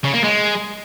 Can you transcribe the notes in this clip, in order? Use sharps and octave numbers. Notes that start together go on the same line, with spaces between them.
C#3
A#3
G#3